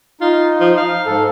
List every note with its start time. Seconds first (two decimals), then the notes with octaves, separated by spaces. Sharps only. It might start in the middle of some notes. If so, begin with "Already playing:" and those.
0.21 D#4 F4
0.61 F3
0.78 F5
1.06 G#2 A4